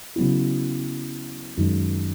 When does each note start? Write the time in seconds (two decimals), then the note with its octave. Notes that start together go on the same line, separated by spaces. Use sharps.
0.16 C#3 F#3 B3 E4
1.57 F#2 D#3 G#3